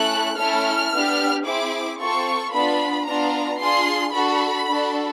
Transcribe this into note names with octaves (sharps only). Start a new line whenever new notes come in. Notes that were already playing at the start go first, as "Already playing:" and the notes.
Already playing: A3 C#4 E4 A4 F#6
A3 C#4 E4 A4 F6
B3 D4 G4
C4 E4 G#4 D6
C4 F4 A4 C#6
B3 D4 F4 B5
B3 D4 F4 A#5
D4 F4 G#4 C6
D4 F#4 A4 B5
D4 F#4 A4